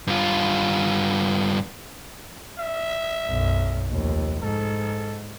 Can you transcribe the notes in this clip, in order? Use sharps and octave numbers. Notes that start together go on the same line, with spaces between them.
G2 F4
E5
B1 F#2
F1 D#2
G#2 A4